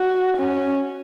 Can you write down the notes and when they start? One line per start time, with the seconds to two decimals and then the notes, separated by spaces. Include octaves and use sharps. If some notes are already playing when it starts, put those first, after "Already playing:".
Already playing: F#4
0.37 C#4